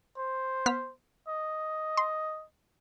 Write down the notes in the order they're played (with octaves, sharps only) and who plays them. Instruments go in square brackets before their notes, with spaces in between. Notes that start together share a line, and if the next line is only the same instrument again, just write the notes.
[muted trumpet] C5
[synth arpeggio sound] B3 F6 B6
[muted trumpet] D#5
[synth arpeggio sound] C6